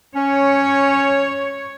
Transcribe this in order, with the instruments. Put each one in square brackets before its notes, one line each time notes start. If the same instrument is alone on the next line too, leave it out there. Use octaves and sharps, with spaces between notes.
[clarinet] C#4 [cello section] C#5